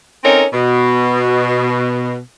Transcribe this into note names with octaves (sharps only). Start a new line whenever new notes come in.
C4 C#4 D#4 A4 A#4
B2